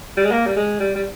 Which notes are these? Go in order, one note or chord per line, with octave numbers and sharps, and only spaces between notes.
G3
G#3
A#3
G3
G#3
G3
G3